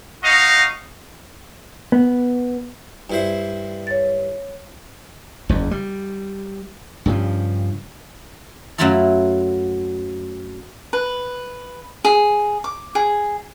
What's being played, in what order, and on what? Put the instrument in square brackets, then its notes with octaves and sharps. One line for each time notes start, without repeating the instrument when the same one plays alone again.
[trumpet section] D#4 F#4 D#5 F5
[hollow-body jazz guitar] B3
[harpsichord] G2 E4 C5
[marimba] C#5 A6
[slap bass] F#1 E2
G3
G2 C#3 F3
[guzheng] F#2 F#3 A3 E4 F4 A4
[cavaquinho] B4
G#4
D6
G#4